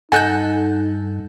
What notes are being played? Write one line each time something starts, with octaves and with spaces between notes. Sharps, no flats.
G2 D#4 A4 D#5 F#5 G#5 F#6 G6